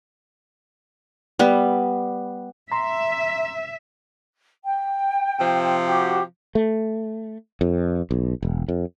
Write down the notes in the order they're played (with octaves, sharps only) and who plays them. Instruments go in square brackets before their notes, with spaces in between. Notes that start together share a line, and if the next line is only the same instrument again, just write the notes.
[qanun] G3 B3
[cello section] E5 [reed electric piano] A#5 C6
[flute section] G5
[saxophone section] C3 F3
[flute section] F#4 G4
[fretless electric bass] A3
F2
B1
E1
F2